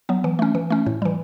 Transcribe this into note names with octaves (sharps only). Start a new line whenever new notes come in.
F#3 B3
E3
A3 C#4
E3
A3 C#4
A2
E3 G3